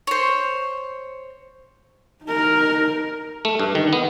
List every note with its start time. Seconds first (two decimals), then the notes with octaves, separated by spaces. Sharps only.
0.07 C5 C#5
2.24 D#4 A#4
3.45 A3
3.60 G2
3.75 D#3
3.93 B3